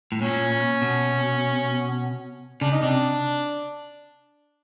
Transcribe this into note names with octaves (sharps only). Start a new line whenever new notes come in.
A2
A#2 C#4
B2
C#3 D4
D#4
C3 D4